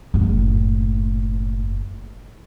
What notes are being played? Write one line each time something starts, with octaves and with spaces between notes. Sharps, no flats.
F#1 A2